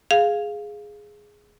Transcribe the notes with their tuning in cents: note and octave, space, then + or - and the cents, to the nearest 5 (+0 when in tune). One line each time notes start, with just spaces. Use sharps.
G#4 +0 F5 +0